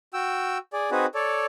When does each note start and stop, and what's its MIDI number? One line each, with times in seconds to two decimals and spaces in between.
0.14 0.58 66
0.14 0.58 79
0.14 0.58 88
0.73 0.90 68
0.73 0.90 74
0.91 1.06 60
0.91 1.06 63
0.91 1.06 66
0.91 1.06 68
0.91 1.06 71
1.14 1.46 69
1.14 1.46 73
1.14 1.46 74